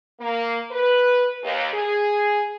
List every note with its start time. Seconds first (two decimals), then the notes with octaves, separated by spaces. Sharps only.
0.20 A#3
0.71 B4
1.43 D#2
1.73 G#4